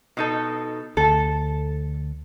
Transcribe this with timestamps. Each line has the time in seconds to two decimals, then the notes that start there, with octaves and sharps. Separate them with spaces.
0.17 B2 D#4 A4
0.97 D2 A4 A5